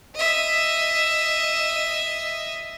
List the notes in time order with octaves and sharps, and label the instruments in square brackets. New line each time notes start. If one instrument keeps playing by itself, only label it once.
[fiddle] D#5 E5